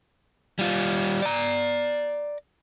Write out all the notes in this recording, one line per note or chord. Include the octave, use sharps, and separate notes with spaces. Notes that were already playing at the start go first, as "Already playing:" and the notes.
G3 F4
D5 A#5